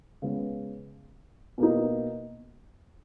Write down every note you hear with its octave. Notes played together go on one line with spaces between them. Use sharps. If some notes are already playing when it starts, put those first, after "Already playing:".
C#3 G#3 B3
B2 A#3 D#4